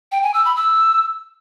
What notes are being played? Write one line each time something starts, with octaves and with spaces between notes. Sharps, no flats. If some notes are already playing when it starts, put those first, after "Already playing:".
G5
G#5
E6
B5
E6